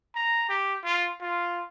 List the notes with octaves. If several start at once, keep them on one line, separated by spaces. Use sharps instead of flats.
A#5
G4
F4
F4